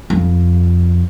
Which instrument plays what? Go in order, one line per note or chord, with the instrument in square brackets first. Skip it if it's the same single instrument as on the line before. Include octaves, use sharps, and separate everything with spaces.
[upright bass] F2